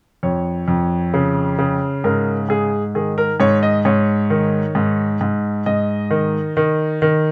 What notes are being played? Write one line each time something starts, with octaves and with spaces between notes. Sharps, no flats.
F2 C#5
F2
C#3
C#3
G#2 A#4
G#2 G#4
D#3 G#4
A#4
G#2 C#5
D#5
G#2 C#5
D#3
G#2
G#2
G#2 D#5
D#3
D#3
D#3